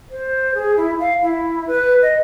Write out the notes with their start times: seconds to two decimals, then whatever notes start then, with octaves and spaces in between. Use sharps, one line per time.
0.10 C5
0.55 G#4
0.77 E4
1.00 F5
1.23 E4
1.67 B4
2.02 D#5